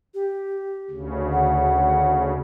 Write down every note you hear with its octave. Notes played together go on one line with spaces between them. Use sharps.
G4
D2 C#3
F#5